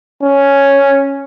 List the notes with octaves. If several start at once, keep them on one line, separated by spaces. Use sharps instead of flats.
C#4